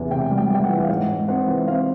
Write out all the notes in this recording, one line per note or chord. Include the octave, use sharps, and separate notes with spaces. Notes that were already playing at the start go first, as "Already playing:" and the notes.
Already playing: E2 C3 E3 G#5
C3 G5
G3
G5
G3 G5
F#5
E3
F5
G#2 F#5
G#2
C4 F#5
E3
C4 F5